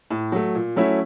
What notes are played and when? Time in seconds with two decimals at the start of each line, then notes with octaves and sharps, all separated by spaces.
0.10 A2
0.32 F#3 A3
0.55 A#2
0.76 F#3 A3 C#4 E4